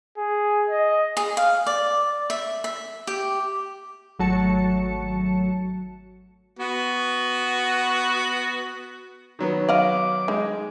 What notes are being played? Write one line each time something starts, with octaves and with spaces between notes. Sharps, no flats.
G#4
D#5
G#4
F5
D5
E5
E5
G4
G#1 F#3 A3 F#4 A5 C#7
B3 F#4
D#3 F#3 B3
D#5 F5 F#5 D6
G#3 D#4